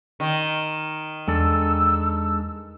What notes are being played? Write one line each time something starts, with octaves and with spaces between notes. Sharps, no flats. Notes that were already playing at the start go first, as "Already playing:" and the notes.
D#3
E2 G#3 D4 A4 E6